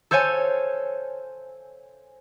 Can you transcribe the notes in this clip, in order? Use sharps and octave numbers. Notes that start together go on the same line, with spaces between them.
A4 C5 C#5 F5 G#5